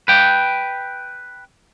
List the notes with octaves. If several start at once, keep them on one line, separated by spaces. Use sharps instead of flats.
B4 G5